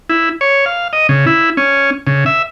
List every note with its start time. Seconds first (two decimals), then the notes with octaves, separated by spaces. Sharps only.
0.10 E4
0.41 C#5
0.66 F5
0.93 D#5
1.09 C#3
1.26 E4
1.57 C#4
2.07 C#3
2.26 E5